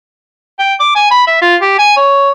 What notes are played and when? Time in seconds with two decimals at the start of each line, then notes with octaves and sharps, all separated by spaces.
0.59 G5
0.80 D6
0.96 G#5
1.11 B5
1.27 E5
1.42 F4
1.61 G4
1.79 G#5
1.96 C#5